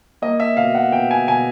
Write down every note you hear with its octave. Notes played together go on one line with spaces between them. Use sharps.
A#3 D#5
E5
B2 F5
F#5
B2 G5
G#5
B2 G#5